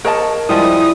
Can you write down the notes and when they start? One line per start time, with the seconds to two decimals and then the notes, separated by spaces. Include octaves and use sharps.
0.05 A#4 C#5 D#5 A5
0.49 F3 G3 G#3 E4 D#6